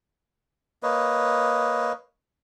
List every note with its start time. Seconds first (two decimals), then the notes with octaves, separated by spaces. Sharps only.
0.83 A#3 B4 C#5 D#5